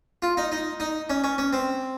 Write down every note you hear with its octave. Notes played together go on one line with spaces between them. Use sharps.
F4
D#4
D#4
D#4
C#4
C#4
C#4
C4